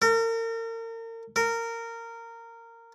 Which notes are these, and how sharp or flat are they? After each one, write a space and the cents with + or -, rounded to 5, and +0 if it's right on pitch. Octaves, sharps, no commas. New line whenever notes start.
A#4 -40
A#4 -20